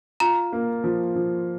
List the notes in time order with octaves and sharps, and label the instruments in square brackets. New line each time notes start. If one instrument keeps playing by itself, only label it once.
[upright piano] F4 [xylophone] A#5
[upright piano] A#3
F3
F3